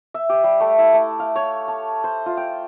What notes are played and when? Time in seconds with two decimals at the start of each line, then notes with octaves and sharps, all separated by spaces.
0.14 E5
0.29 G4
0.44 G3
0.60 A3
0.79 E4
0.94 A3
1.19 F5
1.36 C#5
1.68 A5
2.04 C5
2.26 F4
2.37 G5